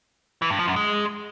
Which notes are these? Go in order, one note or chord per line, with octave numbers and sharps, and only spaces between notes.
E3
G2
F3
F#2
G#3